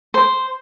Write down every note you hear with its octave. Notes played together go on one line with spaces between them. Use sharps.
C5